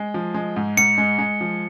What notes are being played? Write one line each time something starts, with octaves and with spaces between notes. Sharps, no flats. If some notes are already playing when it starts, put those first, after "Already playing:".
Already playing: G#3
F3
G#3
G#2
G#2 C#7
G#3
G#3
F3